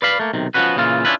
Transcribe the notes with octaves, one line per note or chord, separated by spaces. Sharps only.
B4 D5 F5 B5
A3 A#3
B1 C3 D#3
F3 A3 B3 C#4 F#4 B4
A#2 C#3 E3 F4
C#4 D4 E4 F4 B4